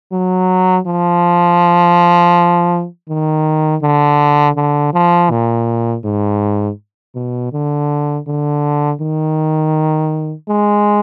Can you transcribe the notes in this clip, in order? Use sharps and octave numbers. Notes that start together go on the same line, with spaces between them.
F#3
F3
D#3
D3
D3
F3
A#2
G#2
B2
D3
D3
D#3
G#3